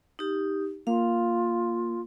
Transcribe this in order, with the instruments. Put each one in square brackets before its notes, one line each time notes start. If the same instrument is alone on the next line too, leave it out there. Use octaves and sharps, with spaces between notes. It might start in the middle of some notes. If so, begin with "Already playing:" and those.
[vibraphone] D#4 G4
[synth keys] A#3 [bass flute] F4 [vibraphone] F5